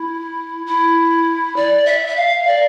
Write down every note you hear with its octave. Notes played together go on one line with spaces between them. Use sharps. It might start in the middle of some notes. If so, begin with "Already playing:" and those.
Already playing: E4
E4
D5
E5
E5
F5
D5